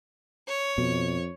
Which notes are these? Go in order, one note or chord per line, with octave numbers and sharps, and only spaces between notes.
C#5
F2 B2